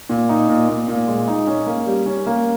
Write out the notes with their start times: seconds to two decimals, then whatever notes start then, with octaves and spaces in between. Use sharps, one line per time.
0.10 A#2
0.29 D#4
0.49 A#2
0.69 A#2
0.88 A#2
1.08 G#3
1.28 D#4
1.47 C#4
1.66 A#3
1.87 G3
2.06 C#4
2.27 A#3